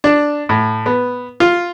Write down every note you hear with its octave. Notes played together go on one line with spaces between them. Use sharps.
D4
A2
B3
F4